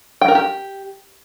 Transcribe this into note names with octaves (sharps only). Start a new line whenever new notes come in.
G5
A#4
G4